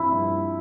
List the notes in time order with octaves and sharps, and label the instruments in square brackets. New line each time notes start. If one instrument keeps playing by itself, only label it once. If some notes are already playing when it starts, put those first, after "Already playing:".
Already playing: [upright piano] G2 F3 C4 [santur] E4
[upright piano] G2